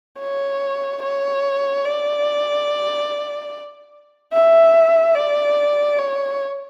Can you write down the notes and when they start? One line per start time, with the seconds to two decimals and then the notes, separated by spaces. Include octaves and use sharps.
0.20 C#5
1.03 C#5
1.85 D5
4.33 E5
5.15 D5
5.98 C#5